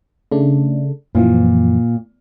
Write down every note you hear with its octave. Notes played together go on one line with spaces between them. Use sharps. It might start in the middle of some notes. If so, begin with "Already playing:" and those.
C#3 A3 D4
F#2 A#2 E3 F3